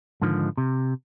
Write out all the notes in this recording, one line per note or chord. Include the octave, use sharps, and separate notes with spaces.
G#2 D3 D#3 F3
C3